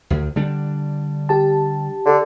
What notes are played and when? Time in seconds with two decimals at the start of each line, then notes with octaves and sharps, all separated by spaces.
0.10 D2
0.36 D3 G3 D4
1.29 G4 A5
2.05 D3